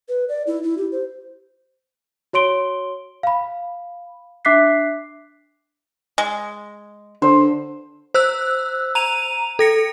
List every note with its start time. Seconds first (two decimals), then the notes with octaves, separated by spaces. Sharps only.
0.09 B4
0.29 D5
0.47 E4
0.63 E4
0.78 G4
0.92 C5
2.33 F#4 C#5 C6 D7 G7
3.23 F5 B5
4.45 D4 E5 D6 F#6 B6 C7
6.18 G#3
7.22 D3 C5
8.14 C5 E6 F#6
8.95 A#5 D#7 F7
9.59 A4 A#6 C#7